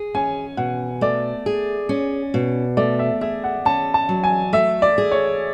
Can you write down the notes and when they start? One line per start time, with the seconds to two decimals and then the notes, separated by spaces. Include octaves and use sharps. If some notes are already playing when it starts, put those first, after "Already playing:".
Already playing: G#4
0.14 C#4 G#5
0.57 B2 F#5
1.01 A3 D5
1.46 G#4
1.89 C#4
2.34 B2
2.77 A3 D5
2.99 E5
3.21 G#4 E5
3.44 F#5
3.65 C#4 A5
3.94 A5
4.09 F#3
4.24 G#5
4.53 A3 E5
4.82 D5
4.98 G#4
5.11 C#5